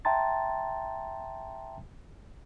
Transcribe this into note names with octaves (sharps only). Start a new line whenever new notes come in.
E5 G5 A5 A#5 C6 A6